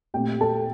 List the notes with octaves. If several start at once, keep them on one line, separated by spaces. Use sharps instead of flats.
A#2 A3 C4 G4 G5
A4 A5